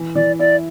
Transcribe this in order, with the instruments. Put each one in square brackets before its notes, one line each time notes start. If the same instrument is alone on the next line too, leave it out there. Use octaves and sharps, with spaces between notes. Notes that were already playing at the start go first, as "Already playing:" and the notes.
Already playing: [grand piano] E3
[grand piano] E3 [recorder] D5
[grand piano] E4 [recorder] D5